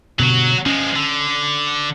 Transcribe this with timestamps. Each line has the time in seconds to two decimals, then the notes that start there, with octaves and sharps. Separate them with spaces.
0.19 G2 B2 D3 F#3 F#4
0.66 F3 G#3 C#4
0.96 D3